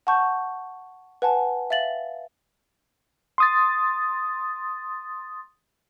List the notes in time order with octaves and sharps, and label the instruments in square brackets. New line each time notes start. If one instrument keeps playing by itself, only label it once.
[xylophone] F#5 A5 C#6 G6
B4 F#5 G#5 A5
E5 F5 A6 F#7
[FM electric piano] C6 D#6 A6